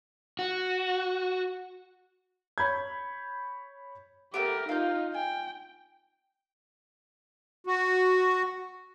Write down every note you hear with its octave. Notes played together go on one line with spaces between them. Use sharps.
F#4
C#5 B5 G6 G#6
A3 B3 G4 A#4 D6
D#4 F4 F5 G6
G5 G#5
F#4